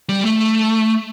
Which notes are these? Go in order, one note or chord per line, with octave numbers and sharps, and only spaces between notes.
G3
A3